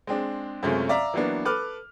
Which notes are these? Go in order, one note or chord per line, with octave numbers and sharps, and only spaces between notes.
G#3 C4 D4
F#2 C3 G#3 A3 C#4 F4
D5 E5 F5 A#5
E3 F#3 A#3 B3 D4
A4 B4 D6 F6